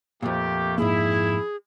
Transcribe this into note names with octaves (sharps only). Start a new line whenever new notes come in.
F2 A#2 A3 A#3 G4
G#2 A#3 E4 G#4